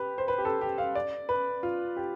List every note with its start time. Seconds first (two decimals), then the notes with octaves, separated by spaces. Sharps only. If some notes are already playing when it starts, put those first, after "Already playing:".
Already playing: G4 B4
0.18 C5
0.28 B4
0.38 G4
0.45 A4
0.61 G4
0.78 F5
0.95 D5
1.29 B4
1.63 F4
1.97 G4